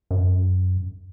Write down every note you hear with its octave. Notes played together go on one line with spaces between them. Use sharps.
F#2